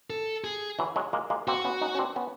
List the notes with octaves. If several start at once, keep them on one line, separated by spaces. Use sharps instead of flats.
A4
G#4
E3 F#3
F#3 G#3
G#3 A#3
G#3 A#3
A#3 C4 F#4
B3 C#4
C#4 D#4
C#4
C4 D4
B3 C#4